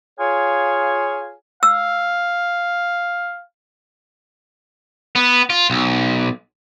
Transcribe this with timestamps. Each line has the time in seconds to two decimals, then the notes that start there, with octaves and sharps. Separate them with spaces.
0.18 F4 G#4 C#5 F5 G#5
1.63 F5 E6
5.16 B3
5.50 F4
5.70 B1